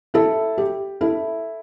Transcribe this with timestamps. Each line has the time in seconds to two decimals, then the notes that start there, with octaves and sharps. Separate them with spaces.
0.14 E4 A4
0.58 G4
1.01 E4 A4